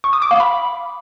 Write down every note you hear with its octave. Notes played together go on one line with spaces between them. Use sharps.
C#6
D#6
D6
F5
B5